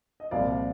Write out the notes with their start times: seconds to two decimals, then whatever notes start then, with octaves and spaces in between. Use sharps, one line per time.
0.20 D#5
0.31 C2 A#2 F3 D5 F5